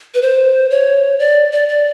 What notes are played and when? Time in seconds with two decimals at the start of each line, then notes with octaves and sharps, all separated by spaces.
0.14 B4
0.22 C5
0.71 C#5
1.19 D5
1.53 D5
1.69 D5